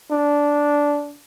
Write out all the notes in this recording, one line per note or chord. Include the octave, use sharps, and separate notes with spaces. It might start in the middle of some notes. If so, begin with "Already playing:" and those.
D4